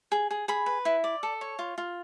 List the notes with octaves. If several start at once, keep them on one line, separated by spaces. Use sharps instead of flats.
G#4
G#4
G#4 B5
B4
E4
D5
A4
C#5
F4
F4